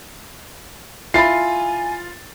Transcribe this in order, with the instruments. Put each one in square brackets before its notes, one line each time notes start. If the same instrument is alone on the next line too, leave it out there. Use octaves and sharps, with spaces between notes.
[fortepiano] E4 B5 [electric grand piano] F4 [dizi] G#5 [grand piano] A6 C7